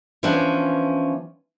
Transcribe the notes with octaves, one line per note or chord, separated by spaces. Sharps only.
E3 F3 B3 C#4 D4